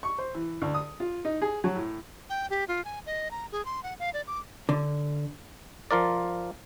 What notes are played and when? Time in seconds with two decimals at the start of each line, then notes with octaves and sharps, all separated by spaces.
0.03 C#6
0.18 C5
0.34 E3
0.62 D2
0.74 D#6
1.00 F4
1.25 D#4
1.42 G#4
1.64 F#3
1.75 A2
2.30 G5
2.50 G4
2.68 F4
2.85 G#5
3.06 D#5
3.31 A#5
3.52 G#4
3.65 C6
3.83 F#5
3.99 F5
4.14 D5
4.27 D6
4.69 D3
5.91 F3 F4 A#4 D5